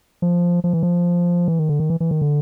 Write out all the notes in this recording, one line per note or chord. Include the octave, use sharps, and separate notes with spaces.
F3
F3
E3
F3
E3
D#3
D3
D#3
E3
E3
D#3
D3